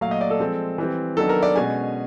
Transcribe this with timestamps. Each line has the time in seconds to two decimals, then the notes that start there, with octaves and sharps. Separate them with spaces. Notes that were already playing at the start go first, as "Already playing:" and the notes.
0.01 A#2 F#3 A3 F5
0.11 D#5
0.21 D5
0.30 A4
0.40 F3 G#3 C4
0.78 E3 G3 C4
1.17 D#3 F#3 B3 D4 A4
1.29 A#4
1.43 D5
1.56 B2 G#3 C#4 G#5